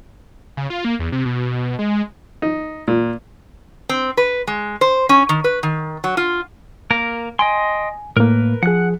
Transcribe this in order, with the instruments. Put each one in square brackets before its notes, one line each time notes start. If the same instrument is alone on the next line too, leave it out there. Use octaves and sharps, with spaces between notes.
[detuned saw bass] C#3
F4
A#3
E2
C3
B2
G#3
[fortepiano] D#4
A#2
[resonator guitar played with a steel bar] C4
B4
G#3
C5
C#4
D#3
B4
D#3
F#3
F4
[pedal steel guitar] A#3 A#4
[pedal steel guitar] D#5 G5 C6 [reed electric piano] G#5
[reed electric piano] A2 A#3 [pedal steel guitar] A#4 B4
[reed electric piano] F3 G#4 [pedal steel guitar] F#5 F#6